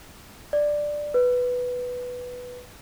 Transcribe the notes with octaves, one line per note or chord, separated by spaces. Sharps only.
D5
B4